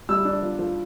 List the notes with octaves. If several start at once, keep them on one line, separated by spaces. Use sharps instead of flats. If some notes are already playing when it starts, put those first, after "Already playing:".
G3 E6
D4
F3
F3